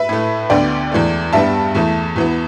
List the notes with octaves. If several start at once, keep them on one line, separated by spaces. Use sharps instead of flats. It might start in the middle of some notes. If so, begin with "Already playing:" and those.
Already playing: B4 E5
A2 A3
D2 D3 B3 D5 G5
E2 E3 A3
G2 G3 B3 E5 A5
E2 E3 A3
E2 E3 B3